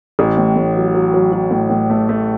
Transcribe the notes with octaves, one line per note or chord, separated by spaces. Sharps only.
A1
A2
A2
F#3
F#3
F#3
F#3
A2
A2
A3
A3